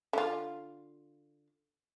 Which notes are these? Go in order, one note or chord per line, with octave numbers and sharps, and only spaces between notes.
D3 F4